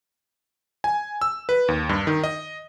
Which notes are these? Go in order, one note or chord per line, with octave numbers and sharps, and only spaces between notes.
G#5
E6
B4
D#2
G2
D#3
D#5